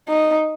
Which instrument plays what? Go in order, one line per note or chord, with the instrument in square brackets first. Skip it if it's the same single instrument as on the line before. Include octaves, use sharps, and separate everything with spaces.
[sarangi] D#4